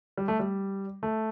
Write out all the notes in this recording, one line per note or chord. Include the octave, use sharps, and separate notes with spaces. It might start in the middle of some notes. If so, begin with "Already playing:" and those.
G3
A3
G3
A3